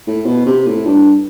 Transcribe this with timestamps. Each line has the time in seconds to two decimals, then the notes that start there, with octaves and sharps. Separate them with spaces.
0.07 A2
0.26 B2
0.46 C3
0.67 A2
0.86 G2